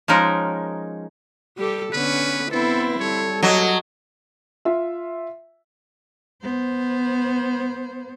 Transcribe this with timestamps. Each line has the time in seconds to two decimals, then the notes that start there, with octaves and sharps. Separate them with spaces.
0.08 F3 G#3 C#4 D#4 A#4
1.57 G3 G4 A4
1.93 D3 B3 C#4 B4
2.51 B3 C4 E4 A4 B4 C5
3.00 G3 A4 C#5
3.43 F#3 A#3 D#5
4.65 F4 E5
6.43 B3 C5